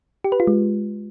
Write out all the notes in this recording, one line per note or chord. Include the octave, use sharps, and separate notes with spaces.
G4
B4
F4
G#3